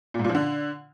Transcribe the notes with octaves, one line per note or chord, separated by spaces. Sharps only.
A#2
G#2
A#2
F3
D3